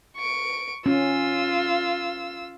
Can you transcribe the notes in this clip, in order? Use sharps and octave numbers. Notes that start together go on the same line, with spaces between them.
C#6 D7
C#4 F4 E6